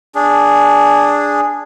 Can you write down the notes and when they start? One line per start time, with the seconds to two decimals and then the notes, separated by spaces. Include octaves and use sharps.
0.15 D4 G#4